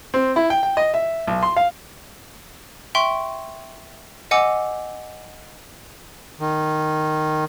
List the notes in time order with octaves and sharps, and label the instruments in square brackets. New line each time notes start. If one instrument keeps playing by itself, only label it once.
[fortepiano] C4
E4
G5
G5
D#5
E5
B1
C6
F5
[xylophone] E5 G5 C6 C#6
D#5 F#5 G#5 D6 E6
[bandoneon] D#3